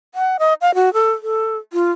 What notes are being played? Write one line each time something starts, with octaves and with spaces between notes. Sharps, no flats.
F#5
D#5
F5
F#4
A4
A4
F4